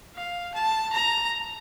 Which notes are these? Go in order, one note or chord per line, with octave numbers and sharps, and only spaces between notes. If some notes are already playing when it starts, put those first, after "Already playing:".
F5
A5
A#5